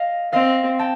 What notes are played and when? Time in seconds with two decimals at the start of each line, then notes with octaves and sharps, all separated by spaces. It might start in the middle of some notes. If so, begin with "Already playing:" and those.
Already playing: D#5 F5
0.33 C4 D#5 F5
0.79 G5 A5